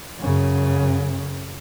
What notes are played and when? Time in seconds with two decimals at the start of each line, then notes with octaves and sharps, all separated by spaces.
0.18 F#2 C#3